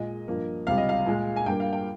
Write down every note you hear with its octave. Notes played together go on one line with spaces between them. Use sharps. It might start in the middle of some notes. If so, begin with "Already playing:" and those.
Already playing: A#2 G#3 D#5
G2 F3 A#3
C#2 C3 G3 F5
D#5
F5
A#2 G#3
G#5
G2 G3 A#3 G5
F5
G5